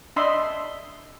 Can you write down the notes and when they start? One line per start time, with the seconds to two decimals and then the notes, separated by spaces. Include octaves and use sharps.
0.16 D4 D#5 E5 B5 C6